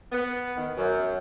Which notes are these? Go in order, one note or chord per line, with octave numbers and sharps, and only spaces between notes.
B3
D#3
F#2